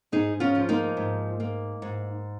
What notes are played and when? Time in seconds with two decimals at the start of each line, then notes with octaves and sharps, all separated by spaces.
0.12 G#2 D#4 G#4
0.40 C#4 F4
0.55 F3
0.69 A#3 D#4
0.97 G#2
1.40 A#3
1.82 G#2